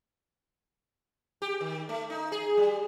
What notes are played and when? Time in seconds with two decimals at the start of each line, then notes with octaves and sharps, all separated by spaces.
1.42 G4
1.61 D#3
1.89 A3
2.10 D#4
2.32 G#4
2.57 G3